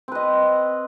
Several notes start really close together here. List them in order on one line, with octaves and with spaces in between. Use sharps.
C4 B4 D#5